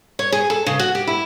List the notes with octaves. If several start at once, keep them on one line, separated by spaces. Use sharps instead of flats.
C#5
G#4
A4
C#3
F#4
G4
E4